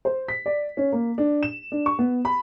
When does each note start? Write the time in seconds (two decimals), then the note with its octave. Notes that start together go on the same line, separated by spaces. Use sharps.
0.05 C5
0.28 B6
0.46 D5
0.77 C#4
0.93 A#3
1.18 D4
1.43 E7
1.72 D4
1.86 C#6
1.99 B3
2.25 B5